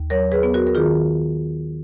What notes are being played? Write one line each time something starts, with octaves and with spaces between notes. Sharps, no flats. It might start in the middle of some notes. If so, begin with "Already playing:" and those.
Already playing: D#2
F#3 A#4 C#5
G#4 B4
B3
F#4 A#4
A#4
D#3 F4 G#4